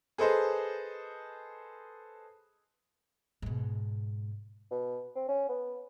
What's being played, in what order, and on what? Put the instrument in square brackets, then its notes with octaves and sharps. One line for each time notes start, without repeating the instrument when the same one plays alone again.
[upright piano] G#4 A4 B4 C5 D#5
[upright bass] G#2 B2
[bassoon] B2
C4
C#4
B3